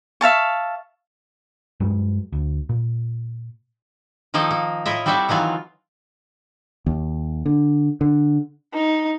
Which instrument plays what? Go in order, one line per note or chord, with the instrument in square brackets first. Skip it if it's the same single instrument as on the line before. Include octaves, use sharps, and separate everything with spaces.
[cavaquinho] E5 F5 A5 C#6
[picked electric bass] G2 F#3 G#3
D2
A#2
[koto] D#3 F3 A#3 D#4 A4
A#3
A2 E4 F4 D#5 E5
G3 C4 F#4 A4 D5 E5
D#3 E3 F#3 F4
[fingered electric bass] D#2
D3
D3
[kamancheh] D#4